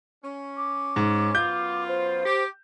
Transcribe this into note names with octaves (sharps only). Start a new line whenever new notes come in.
C#4
D6
G#2
F#2 B3 F4 G6
C5
G4